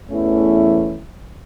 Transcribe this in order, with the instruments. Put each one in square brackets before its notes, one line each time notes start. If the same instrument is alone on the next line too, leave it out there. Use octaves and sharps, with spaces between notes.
[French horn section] E2 E3 A3 C#4 E4